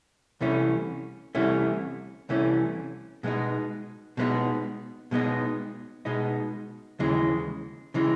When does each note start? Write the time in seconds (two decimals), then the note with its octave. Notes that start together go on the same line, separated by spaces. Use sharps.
0.40 C2 C3 E3 A3 C#4
1.35 C2 C3 E3 A3 C#4
2.29 C2 C3 E3 A3 C#4
3.23 B2 G#3 B3 D#4
4.17 B2 G#3 B3 D#4
5.11 B2 G#3 B3 D#4
6.05 B2 G#3 B3 D#4
6.99 D#2 C#3 E3 G#3
7.94 C#3 E3 G#3